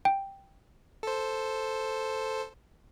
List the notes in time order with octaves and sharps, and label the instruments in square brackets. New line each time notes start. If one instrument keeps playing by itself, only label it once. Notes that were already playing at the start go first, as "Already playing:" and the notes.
[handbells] G5
[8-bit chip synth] A4 C5